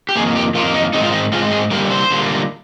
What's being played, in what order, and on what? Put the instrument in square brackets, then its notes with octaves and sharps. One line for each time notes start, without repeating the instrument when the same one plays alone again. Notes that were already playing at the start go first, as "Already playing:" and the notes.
[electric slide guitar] G4
A#3 G#4
F2 D#3
G4
F2 D#3 A#3 F4
D#4
G#2 D#3 G#3 C4 D#4
F4
D#4
G#2 D#3 G#3 C4 F4
G#4
D3 G3 A#3 A#4
C5
D3 G3 A#3